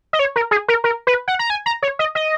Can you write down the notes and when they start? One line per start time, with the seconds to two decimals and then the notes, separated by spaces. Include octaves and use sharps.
0.13 D#5
0.19 C#5
0.36 A#4
0.51 G#4
0.68 A#4
0.84 A#4
1.07 B4
1.28 F#5
1.39 A#5
1.50 G#5
1.66 A#5
1.83 C#5
1.99 D#5
2.15 D#5